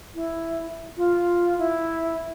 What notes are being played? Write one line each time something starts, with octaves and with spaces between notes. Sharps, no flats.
E4
F4
E4